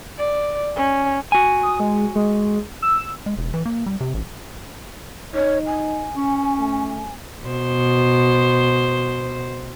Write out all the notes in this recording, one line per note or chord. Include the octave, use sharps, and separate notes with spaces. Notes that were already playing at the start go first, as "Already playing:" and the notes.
D5
C#4
F#4 G#5
D#6
G#3
G#3
E6
G#3
E1
E3
A#3
G3
C3
A1
D#4 C#5
G#5
C#4
A3
B2 C5